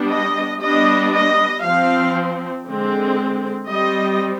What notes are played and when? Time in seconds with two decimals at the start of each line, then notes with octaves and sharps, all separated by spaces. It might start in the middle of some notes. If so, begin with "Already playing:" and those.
Already playing: G3 B3 D4
0.10 D#5
0.62 G3 B3 D4 D#5
1.14 D#5
1.65 F3 C4 F5
2.67 D3 G#3 C4
3.70 G3 C4 D#5